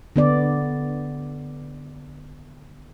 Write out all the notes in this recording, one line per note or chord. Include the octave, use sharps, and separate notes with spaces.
D3 B3 D5